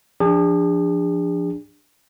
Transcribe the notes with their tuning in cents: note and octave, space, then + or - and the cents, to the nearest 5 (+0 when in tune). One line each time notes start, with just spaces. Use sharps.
F3 -10 D4 +0 G#4 -40